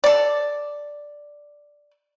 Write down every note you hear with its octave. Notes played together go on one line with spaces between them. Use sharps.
A4 D5